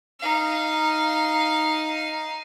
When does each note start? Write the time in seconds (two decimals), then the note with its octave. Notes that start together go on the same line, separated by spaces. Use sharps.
0.20 D#4 F5